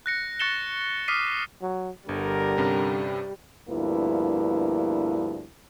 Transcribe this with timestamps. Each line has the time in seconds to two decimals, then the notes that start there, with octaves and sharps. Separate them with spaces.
0.06 F#6 A#6 C#7
0.40 C#6 F#6 A6 C#7 E7 G7
1.08 D6 D#6 F6 B6 C7 D#7
1.62 F#3
2.09 G1 D3 G3 A#4
2.57 G2 C3 C#4
3.69 D2 G2 F3 A#3 B3 E4